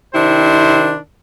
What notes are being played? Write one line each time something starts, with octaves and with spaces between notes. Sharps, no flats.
C3 D#3 D4 E4 C5